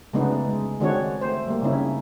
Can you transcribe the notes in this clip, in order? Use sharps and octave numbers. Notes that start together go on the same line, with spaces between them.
C#3 G#3 A3 B3 D4 D#4
G#3
D#3 G#3 C4 D4 F#4 C#5
A3 C5
G3 A#3
C#3 C4 C#4 D#4 E4